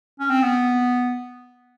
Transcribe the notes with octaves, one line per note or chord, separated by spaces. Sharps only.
C#4
C4
B3